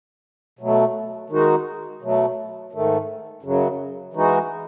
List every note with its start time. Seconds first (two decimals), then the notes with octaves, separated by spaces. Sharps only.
0.59 B2 F#3 A3
1.30 D#3 G#3 D#4 F#4
2.02 B2 F#3 A3
2.73 G#2 D#3 A3
3.43 F#2 C#3 F#3
4.14 E3 G#3 D#4 F#4